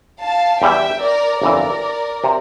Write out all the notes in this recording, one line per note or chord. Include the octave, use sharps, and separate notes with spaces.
F5 A5
E2 E3 G3 E5 G5
A#4 D5
G1 F2 E3 A#4 D5
C3